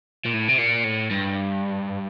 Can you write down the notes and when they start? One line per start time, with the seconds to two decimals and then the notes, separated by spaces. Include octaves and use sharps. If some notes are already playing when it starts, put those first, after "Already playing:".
0.25 A#2
0.33 A2
0.48 C3
0.58 A#2
0.84 A2
1.11 G2